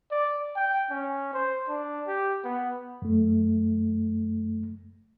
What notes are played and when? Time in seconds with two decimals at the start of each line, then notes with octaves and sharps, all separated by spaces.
0.11 D5
0.56 G5
0.91 C#4
1.34 C5
1.69 D4
2.08 G4
2.44 B3
3.02 F#2 A3